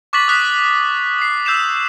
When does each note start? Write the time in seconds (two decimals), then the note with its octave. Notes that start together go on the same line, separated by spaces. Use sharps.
0.13 C#6 D6 F#6 A6 B6 F#7
0.28 D#6 F#6 B6
1.18 D#6 C7
1.45 E6 G6 C7 E7 F7